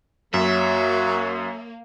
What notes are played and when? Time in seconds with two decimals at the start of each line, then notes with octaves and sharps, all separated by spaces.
0.34 F#2 F#3 A#3 E5